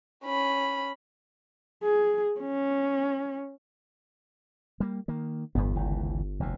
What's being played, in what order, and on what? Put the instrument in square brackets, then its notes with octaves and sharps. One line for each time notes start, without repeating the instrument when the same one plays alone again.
[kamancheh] C#4 B5
[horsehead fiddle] G#4
C#4
[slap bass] G3 A#3
D#3 A#3
[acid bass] G1 [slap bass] E2 G2 B3
[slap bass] G#1 C#2 E3
F1 D2 B2